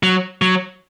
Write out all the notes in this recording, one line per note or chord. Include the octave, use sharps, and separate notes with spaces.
F#3
F#3